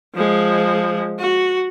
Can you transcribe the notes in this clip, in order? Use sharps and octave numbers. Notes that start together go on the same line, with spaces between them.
F3 G#3
F#4